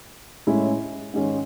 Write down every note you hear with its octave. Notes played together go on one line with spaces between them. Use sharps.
A2 G#3 C#4 E4
G#2 D#3 G#3 C#4